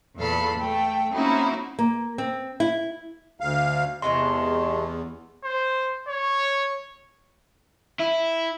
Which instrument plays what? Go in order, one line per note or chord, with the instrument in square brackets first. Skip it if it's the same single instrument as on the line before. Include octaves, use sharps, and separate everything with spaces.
[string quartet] E2 A#2 A4 F5 B5
A3 G5
A#3 C4 C#4 D#4 E4 F#4
[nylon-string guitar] A#3
C4
E4
[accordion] D2 F5
[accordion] E2 [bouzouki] C3 G#3 A3 [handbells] C6
[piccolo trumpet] C5
C#5
[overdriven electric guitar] E4